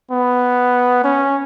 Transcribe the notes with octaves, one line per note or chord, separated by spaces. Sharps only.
B3
C#4